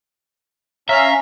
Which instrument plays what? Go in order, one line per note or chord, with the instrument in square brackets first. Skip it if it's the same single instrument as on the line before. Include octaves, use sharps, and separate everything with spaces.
[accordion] C#4 F5 A#5 [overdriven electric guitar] E5